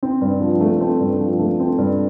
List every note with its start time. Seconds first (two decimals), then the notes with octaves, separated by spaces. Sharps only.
0.03 C4
0.21 G2
0.41 F3
0.61 A3
0.81 C4
1.00 G2
1.20 F3
1.39 A3
1.60 C4
1.78 G2